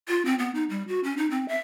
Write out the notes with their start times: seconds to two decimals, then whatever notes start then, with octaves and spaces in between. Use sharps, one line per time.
0.08 F4
0.25 C4
0.39 B3
0.55 D#4
0.70 G3
0.88 F#4
1.04 C#4
1.18 D#4
1.31 C4
1.48 E5